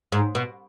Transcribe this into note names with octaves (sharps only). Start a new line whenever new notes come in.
G#2
B2